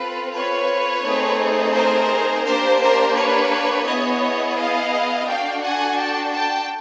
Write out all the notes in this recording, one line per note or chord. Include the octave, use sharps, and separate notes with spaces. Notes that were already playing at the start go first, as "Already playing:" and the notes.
Already playing: C4 F4 A4 B4
B4 C#5
A3 C4 D#4 G#4
A#4 C5
A#3 D4 G4 A#4 C5
A#4 C5
B4 C#5
B3 E4 G#4 C#5 D#5
D#5 F5
D4 F#4 A4 F5 G5
F#5 G#5
G5 A5
G5 A5